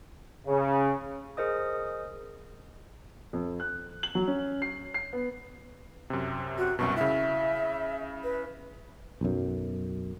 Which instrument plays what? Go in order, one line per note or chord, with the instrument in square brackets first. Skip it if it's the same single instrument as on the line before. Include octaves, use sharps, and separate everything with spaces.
[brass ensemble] C#3
[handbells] G#4 A#4 C5 D#5 D#6
[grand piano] F2
F#6
F#7
F#3
C#4
C7
C7
B3
[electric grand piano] F#2 C3
[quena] F#4
[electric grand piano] C2 F#2 B2 [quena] C#6
[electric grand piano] C#3 E4 [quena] E5
[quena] B4
[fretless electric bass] B1 F#2